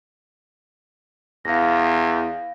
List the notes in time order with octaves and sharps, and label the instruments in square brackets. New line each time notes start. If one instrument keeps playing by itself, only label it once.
[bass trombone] E2 [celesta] F5 A#6